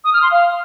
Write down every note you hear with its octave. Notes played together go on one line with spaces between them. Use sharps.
D#6
F6
C6
F5